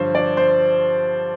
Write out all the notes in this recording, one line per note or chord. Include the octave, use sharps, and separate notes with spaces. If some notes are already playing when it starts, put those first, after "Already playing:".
Already playing: G2 D3 F3 C5 C#5
D5
C5